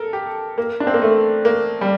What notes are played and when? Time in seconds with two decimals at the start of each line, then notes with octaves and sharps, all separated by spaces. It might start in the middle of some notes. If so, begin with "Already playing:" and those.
Already playing: A4 A#4
0.13 G4
0.58 A#3
0.80 D4
0.87 C4
0.94 A#3
1.02 A3
1.45 A#3
1.81 G3